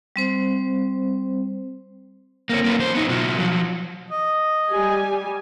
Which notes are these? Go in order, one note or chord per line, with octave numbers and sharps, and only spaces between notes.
G3 C4 C5
A#3 C4 C#5
A#3 C#4 E4 F4 B4
E2 C5
B3 D#4
B2 F#3 F4 F#4
F3 F#3
D#5
G3 G4 G#5